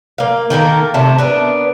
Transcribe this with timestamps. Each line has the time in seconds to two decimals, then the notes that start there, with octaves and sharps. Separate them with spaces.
0.18 A#3 F5
0.50 D#3 A#3 A4 A#4
0.94 C3 A3 A5
1.18 B3 D4 A#4